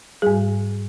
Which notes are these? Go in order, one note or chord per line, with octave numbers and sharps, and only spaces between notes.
G#2 G3 G#4